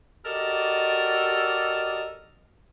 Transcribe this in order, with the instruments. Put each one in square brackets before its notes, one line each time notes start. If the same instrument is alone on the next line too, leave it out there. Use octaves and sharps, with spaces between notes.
[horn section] F#4 G4 A4 A#4 D5 D#5